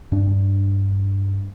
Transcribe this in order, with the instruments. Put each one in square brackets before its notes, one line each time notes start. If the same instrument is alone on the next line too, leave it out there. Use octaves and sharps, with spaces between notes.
[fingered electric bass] G2 D4